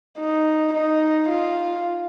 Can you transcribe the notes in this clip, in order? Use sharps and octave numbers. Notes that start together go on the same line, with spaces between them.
D#4
D#4
F4